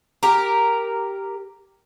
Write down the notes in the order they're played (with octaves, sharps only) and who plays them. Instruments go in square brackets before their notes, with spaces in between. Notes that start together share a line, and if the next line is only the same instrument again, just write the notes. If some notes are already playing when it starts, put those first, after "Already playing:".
[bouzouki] G4 A#4